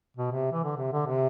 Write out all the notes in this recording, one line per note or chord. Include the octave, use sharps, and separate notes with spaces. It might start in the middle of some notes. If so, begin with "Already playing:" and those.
B2
C3
E3
D3
C3
D3
C3